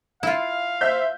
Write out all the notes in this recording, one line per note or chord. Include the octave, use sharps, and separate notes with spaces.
E4 F4 F5
C5 E5 G6